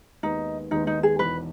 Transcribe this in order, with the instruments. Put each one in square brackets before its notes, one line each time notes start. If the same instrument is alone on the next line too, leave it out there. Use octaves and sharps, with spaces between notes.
[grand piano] D#2 D#3 G#3 B3 [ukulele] D#4
[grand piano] D#2 D#3 G#3 B3 [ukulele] D#4
[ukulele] D#4
G#4
[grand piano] E1 E2 D#3 [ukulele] B4